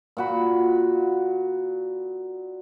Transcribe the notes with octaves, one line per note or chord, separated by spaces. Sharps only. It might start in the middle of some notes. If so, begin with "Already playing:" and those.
A#2 F#4 B5